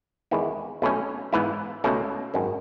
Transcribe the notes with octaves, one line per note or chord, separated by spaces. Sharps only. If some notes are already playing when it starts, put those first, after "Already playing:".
E2 D#3 G#3 B3 E4
B1 B2 A3 C#4
G#2 E3 B3 E4
C#2 B2 A3 C#4
G#1 F#2 D#3